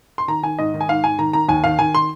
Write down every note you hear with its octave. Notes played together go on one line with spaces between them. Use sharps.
C6
D#3 A#5
D#3 G#5
G#2 D#5
D#3
G#5
G#2 F5
G#2 G#5
D#3 A#5
D#3 A#5
D#2 G#5
D#3 F5
D#3 G#5
C6